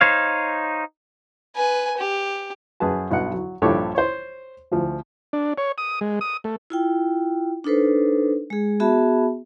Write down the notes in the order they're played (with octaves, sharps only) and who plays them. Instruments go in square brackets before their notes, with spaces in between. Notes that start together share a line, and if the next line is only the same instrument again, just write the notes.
[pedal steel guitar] D#4 C5 C#5 F5
[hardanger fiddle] B4 G#5
G4
[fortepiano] F#2 G#4 B4 A5
B1 G2 D#5 F#5
F#3
A#1 G2 G4 A4 C#5 D6
C5 C#5
D2 F3
[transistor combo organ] D4
C#5
D#6
G#3
D#6
A3
[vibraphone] E4 F4 G5
D4 D#4 A4 B4 C5
G#3 G#4
B3 F#4 G#4 E5 A5 B5